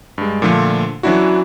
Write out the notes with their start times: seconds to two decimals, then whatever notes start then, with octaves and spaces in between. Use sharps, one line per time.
0.18 G2 G#3
0.42 A#2 D3 F3 A3
1.03 E3 F#3 C#4 D4 E4 F#4